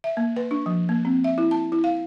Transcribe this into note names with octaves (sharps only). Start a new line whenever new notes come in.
E5
A#3
B4
D4
F3
A#3
C4
E5
E4
A5
E4
F5